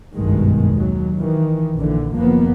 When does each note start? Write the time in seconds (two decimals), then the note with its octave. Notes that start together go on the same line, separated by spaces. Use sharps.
0.15 F#1 B1 G2 B2 D#3 G#3
0.72 D#2 F#3
1.20 D#3 E3
1.78 A#1 D3 E3
2.16 F#1 D#3 F3 A#3 B3